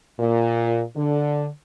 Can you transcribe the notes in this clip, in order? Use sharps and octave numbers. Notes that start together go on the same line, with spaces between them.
A#2
D3